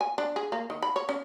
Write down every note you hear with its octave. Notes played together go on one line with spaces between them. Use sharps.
G#5
D4
G#4
A#3
D#3
B5
C#5
C#4